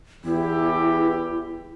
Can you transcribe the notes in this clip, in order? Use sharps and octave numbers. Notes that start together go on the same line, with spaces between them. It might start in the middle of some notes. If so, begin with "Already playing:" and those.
E2 E4 G4